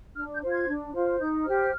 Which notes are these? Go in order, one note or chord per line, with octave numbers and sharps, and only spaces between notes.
D4 F6
G6
F4 C5
G#6
D4
F4 C5
D#4 G6
G4 C5 F6